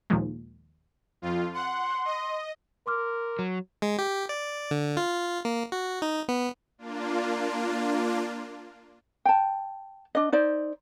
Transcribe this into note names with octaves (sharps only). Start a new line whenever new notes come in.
D#2 A#2 D#3 F3 G#3
F2 F4
F#5 C6
D#5
A#4 C6 D6 F6
F#3
G#3
G4
D5
D3
F4
A#3
F#4
D#4
B3
A#3 D4 F4
G5 A5
D4 D#5
D#4 C5 D5